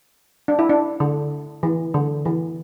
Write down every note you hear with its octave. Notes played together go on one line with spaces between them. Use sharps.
D4
E4
D4
D3
E3
D3
E3